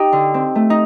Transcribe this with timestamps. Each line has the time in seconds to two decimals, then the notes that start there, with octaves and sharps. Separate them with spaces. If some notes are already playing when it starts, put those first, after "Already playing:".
Already playing: D#4 G4
0.12 D3
0.34 C4
0.55 A3
0.70 D#4